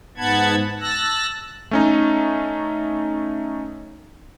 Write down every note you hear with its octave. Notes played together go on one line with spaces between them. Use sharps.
G#2 B3 F#5 A5 B5 G#6
A5 E6 F#6 A#6
A3 C#4 D#4